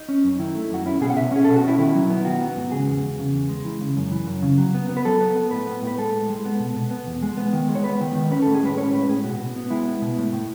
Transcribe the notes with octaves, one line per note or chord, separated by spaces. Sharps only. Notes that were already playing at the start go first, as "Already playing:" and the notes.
Already playing: D#4
C#4
F#2
D#3 E4
A3
F#2 F#4
C#4 E4
B2 G#4
F#5
B2 E5
C#4 G#4
B2 A4
F#4
C#4 E4
D#3 E4
F#3
B3
D#3 F#4
B3
G#2
C#3 G#4
E2
E2
C#3
E2
G#3
E3
C#3
F#2
E3
F#2
C#3
F#3
B3
B3
B4
F#3 A4
B3
B3
A2 B4
B3
A2
B4
G#3 A4
A2
G#3
B3
B2
B2
B3
E2
G#3
B3
D#3
G#3
C#5
B3 B4
D#3
D#3
C#4 B4
A2 A4
G#4
G#3 B4
C#4 C#5
A2 B4
A2 G#4
B2 F#4
B2
B3
G#3 E4
B3
B2
A2
A2